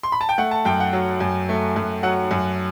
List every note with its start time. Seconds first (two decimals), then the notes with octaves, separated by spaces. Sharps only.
0.03 C6
0.12 B5
0.21 A5
0.29 G5
0.38 A3 F#5
0.51 A5
0.65 F#2 G5
0.80 F#5
0.93 F#3
1.20 F#2
1.49 A3
1.76 F#2
2.03 F#3 F#5
2.31 F#2